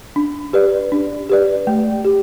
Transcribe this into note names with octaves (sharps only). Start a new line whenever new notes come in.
D4
G4 B4 D5
D4
G4 B4 D5
A3
G4